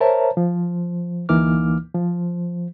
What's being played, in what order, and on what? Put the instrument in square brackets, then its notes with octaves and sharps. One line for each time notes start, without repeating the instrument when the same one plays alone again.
[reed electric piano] A#4 C5 C#5 E5 A5 A#5
F3
D2 E3 A#3 D#4 D6 F6
F3